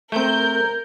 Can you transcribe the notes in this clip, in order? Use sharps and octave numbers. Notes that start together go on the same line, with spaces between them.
A3 C4 A#4 G6